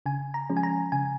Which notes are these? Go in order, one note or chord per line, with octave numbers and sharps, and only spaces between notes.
C#3 G#5
A#5
F3 G#3 C#4
G#5
A#5
C#3 G#5